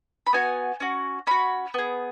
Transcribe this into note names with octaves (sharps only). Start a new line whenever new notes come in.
B5
B3 F#4 G#5
C#4 F#4
C#4 F#4 B5
B3 G#4